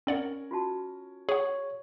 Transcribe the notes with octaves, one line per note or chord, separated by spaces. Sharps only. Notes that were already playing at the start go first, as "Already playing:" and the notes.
C4 C#4 A#4 D5 F#5
F4 F#4 A5
G#4 C#5 F#5